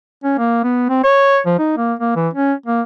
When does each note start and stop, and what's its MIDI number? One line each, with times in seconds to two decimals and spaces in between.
0.24 0.35 61
0.38 0.60 58
0.63 0.85 59
0.89 1.00 60
1.04 1.38 73
1.46 1.54 53
1.59 1.75 63
1.77 1.94 58
1.99 2.13 58
2.16 2.29 52
2.33 2.53 61
2.66 2.82 58